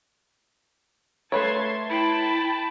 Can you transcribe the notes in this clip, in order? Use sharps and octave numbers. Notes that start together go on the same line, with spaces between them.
A3 B4 C#5 A5 C6 G#6
E4 G5 A5 B5